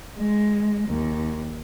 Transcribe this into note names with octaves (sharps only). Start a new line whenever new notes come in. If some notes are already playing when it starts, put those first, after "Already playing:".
G#3
D#2